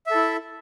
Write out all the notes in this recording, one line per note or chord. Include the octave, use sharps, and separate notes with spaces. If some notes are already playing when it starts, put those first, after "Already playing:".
E4 A4 E5